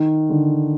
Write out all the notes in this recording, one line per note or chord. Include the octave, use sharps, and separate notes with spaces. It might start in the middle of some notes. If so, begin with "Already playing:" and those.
Already playing: D#3
D3